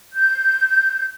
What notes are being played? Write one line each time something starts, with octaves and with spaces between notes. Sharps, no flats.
G6